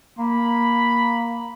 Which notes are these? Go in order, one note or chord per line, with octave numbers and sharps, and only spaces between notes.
A#3 B5